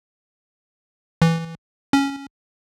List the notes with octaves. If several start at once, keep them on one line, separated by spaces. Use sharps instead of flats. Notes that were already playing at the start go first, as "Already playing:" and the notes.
E3
C#4